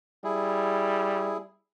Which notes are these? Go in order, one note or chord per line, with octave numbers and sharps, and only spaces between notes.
G3 E4 G#4